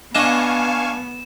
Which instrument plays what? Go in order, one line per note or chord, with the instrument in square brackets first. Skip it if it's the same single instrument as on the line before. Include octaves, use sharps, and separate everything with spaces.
[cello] B3 [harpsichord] D4 D#5 A5 [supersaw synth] F5 G#5 C#6 [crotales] E7